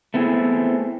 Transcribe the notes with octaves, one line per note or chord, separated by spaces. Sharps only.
A3 B3 C4 E4 G#4